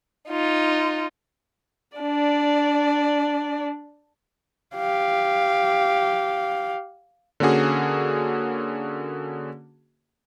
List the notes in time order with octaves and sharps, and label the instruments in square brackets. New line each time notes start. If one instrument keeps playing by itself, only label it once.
[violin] D#4 F4
[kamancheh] D4 D5
[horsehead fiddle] G4 F5
[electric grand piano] D3 A#3 C#4 F#4 G#4